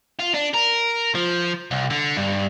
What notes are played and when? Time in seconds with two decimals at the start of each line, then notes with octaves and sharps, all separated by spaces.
0.19 F4
0.34 D4
0.54 A#4
1.15 F3
1.71 C2
1.90 D3
2.17 G2